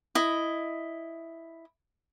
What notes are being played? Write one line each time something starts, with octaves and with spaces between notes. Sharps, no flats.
E4 D#5